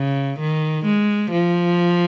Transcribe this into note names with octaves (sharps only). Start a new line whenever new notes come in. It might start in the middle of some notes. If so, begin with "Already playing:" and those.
Already playing: C#3
D#3
G#3
F3